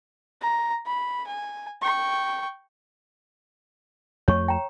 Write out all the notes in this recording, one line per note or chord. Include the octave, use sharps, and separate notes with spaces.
A#5
B5
G#5
G5 C#6
F2 A3 C#5 C#6
G5 A#5